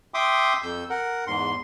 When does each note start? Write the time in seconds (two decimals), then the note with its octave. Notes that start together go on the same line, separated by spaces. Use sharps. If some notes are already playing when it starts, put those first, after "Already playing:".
0.14 E5 G5 C6 D6 D#6
0.63 F2 E6 G6
0.90 A#4 F#5
1.27 E2 G#2 C6